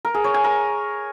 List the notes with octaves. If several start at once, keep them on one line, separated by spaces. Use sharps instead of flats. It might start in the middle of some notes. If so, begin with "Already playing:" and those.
A#4
G#4
C#5
G#5
A#4